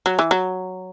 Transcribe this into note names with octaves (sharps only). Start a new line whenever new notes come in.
F#3
E3
F#3